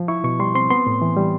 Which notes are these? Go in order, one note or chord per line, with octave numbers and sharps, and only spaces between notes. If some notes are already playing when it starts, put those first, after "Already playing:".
Already playing: F3
E4 C#6
B2 C#6
G3 C6
C4 C6
B3 C6
A2
E3
G3